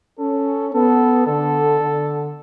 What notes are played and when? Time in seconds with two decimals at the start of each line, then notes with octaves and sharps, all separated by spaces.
0.19 C#4 A4
0.73 B3 A4
1.27 D3 A4
1.80 D3